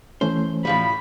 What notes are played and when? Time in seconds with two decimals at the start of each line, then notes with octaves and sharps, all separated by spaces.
0.21 E3 A3 C#4 C5
0.65 A2 F3 G3 B5